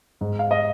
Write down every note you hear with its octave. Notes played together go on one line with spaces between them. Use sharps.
G#2
F5
D#5